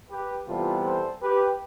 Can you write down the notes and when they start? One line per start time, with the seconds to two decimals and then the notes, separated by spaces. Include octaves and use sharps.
0.10 G4 B4
0.47 C3 E3 G3 B3 F4 A4
0.84 A4 C5
1.21 G4 B4